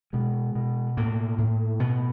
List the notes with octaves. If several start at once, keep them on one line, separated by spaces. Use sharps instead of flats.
B2 G#3
B2
A2 A#3
A2
B2 B3